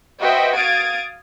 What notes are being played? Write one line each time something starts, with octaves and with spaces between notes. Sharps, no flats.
F#4 B4 C5 D#5 E5 G5
F5 D#6 G#6 A6 D7